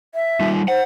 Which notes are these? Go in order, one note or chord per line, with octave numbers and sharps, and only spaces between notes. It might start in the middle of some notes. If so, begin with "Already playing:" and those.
E5
G3 D#4 F4
C5 F#5